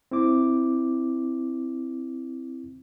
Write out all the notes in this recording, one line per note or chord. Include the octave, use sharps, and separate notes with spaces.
C4 E4 D6